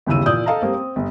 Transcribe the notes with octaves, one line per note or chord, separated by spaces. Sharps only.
G1 D#2 C#3 E3 E6 D#7
A#2 E3 D5 D#6 G6
A4 D#5 F5 A5 A#5
G3 A#3 C4
C4
G1